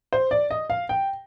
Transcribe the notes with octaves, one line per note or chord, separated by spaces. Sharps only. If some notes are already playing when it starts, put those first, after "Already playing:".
C5
D5
D#5
F5
G5